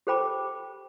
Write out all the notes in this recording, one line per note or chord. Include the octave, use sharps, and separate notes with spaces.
G4 A4 C5 G5 B5 D6